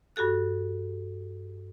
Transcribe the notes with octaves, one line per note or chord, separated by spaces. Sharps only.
G2 F#4 G4 A4 F#6